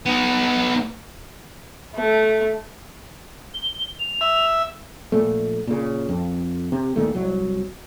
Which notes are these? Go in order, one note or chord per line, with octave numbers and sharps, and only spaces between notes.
B3 D#4
A3
G7
F7
E5
A#1 A#2 A3
A#2 C#3
F2
C3
D#2 A#2 D#3 A3
C2 F#3